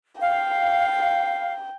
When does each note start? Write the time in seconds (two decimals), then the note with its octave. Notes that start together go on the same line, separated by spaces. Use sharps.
0.20 F5 G5